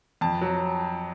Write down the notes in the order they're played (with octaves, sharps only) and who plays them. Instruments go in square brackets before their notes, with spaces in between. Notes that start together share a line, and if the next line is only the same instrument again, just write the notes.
[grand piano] F2 A5
F#3